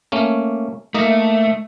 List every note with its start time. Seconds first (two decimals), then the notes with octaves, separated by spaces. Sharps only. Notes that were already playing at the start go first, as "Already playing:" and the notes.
0.12 A3 A#3 C#4
0.95 A3 A#3 D#4 D#5